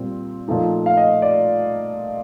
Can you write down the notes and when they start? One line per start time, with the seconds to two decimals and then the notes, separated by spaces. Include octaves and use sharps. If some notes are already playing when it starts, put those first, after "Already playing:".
Already playing: A#2 G3 C4
0.48 A#2 F3 A3 D#4
0.86 F5
0.97 D#5
1.22 D5